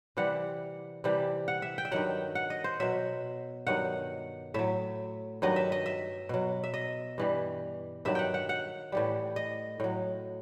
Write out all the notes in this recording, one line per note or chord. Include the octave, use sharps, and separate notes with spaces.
C3 E3 G3 F#5
C3 E3 G3
F#5
E5
G5
E5
G2 D#3 F#3 F#5
F#5
D#5
C5
B2 F#3 E5
G2 D#3 F#3 F#5
A2 F#3 E5
G2 D#3 F#3 D#5
E5
D#5
E5
B2 F#3
E5
D#5
G2 E3 G3
G2 D#3 F#3 E5
F#5 G5
F#5
F#5
A2 E3 G3
D#5
A2 F#3